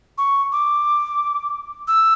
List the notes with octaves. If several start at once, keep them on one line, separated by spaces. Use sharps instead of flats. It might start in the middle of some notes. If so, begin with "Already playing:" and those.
C#6
D6
E6